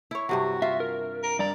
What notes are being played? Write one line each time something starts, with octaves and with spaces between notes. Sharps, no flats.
E4 C#5
G2 C3 F#3 F#4
F4 E5
A#4
A#4
G2 D5 A#5